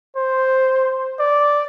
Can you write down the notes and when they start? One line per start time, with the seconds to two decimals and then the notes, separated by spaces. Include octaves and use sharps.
0.17 C5
1.20 D5